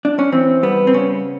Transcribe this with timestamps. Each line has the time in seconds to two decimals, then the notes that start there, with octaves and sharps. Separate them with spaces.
0.05 D4
0.19 C#4
0.32 E3 C4
0.63 G3 B3
0.87 C4
0.93 C#3 C#4